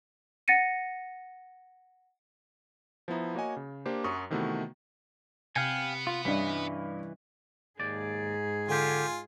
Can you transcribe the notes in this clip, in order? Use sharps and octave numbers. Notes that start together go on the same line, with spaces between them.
F#5 A6 A#6 C#7 D#7
F3 B3 E4 A#5
A#3 F#4 C#5 D#5 G#5
C#3
A#3 D4 G4 C5
F#2 F#3 F#4 C#6 D#6
C3 D#3 E3 A3 B3 F#4
C3 B3 F5 G5 G#5
F4
G2 E3 G3 C#4 D5 D#5 B6
D#2 G#2 G#4 D5
D3 C#4 F4 G4 G#5